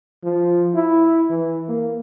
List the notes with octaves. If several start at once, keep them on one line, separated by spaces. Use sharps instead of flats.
F3
E4
E3
A#3